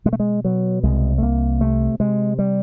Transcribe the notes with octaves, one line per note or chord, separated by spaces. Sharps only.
B2 G#3
A3
G#3
B2 F#3
C2 G#3
A3
C2 A#3
C3 A3
C3 G#3
G3